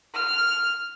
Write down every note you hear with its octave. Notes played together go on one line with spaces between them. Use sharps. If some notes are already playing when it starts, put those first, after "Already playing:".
F6